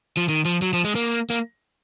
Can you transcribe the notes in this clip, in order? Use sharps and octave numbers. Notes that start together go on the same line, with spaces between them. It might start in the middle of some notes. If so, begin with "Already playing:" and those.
F3
D#3
F3
F#3
F3
G#3
A#3
A#3